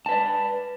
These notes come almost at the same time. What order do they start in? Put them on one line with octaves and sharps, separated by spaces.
A5 B4 D5